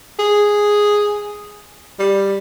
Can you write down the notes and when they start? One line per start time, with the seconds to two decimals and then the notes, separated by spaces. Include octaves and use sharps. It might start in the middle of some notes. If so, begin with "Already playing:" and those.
0.19 G#4
1.99 G3